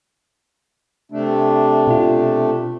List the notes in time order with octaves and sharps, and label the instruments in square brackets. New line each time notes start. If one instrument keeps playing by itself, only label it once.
[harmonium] C3 A3 D4
[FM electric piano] B2 F4